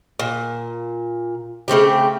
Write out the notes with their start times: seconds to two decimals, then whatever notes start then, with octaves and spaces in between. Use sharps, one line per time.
0.19 A#2
1.68 C#3 A3 C4 G4